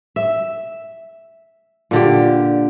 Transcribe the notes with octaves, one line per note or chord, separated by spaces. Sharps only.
E5
A#2 D3 G4